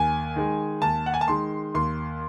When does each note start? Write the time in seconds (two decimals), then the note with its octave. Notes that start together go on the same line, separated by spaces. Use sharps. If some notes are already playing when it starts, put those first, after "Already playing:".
Already playing: D#2 G#5
0.36 D#3 G#3
0.82 D#2 A5
1.06 F#5
1.14 G#5
1.21 A5
1.28 D#3 G#3 C6
1.75 D#2 C6